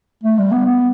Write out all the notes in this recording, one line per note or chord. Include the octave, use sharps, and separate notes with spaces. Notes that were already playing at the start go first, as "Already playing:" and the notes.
A3
G3
B3
B3